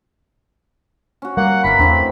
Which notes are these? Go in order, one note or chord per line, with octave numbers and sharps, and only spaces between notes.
C#4 F#4
G3 A#3 F#5
G1 E3 E4 A#4 B5
E2 A2 C#3 C4 D4